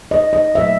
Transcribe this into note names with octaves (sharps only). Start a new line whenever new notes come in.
D#5
D#5
A#2 F#3 A3 E5